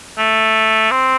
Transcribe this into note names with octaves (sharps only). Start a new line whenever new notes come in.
A3
C4